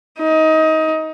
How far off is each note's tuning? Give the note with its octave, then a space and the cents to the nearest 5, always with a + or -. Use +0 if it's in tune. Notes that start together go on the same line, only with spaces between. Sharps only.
D#4 +20